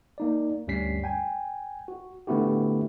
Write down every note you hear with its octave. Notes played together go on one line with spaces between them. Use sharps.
A#3 D#4 D5
D2 G2 G3 C#4 B6 C7
G5 G#5
F#4
D3 A3 B3 E4 F#4 G4